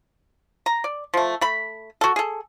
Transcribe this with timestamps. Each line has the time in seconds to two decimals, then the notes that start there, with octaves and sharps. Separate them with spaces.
0.66 A#5
0.84 D5
1.14 F3 A3
1.41 A3 B5
2.01 F#4 A4
2.16 G#4 A4